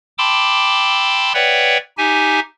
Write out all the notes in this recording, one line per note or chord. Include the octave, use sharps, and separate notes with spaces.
G5 A5 B5 C6 D6 E6
B4 C#5 D5 E5 F#5 G5
D#4 G4 E5 G#5